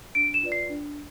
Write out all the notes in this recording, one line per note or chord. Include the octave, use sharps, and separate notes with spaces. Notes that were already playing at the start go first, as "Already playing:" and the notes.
D4 D7
E7
F4 B4 D5
C7
D4